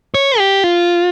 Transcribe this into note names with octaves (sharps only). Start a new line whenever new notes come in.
C#5
G4
F4